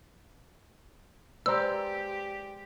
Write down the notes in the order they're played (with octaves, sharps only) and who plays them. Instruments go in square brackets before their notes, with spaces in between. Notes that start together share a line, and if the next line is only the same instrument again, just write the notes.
[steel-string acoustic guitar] G#3 D5 [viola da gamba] G4 [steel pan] B4 C5 A#5 [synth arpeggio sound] E6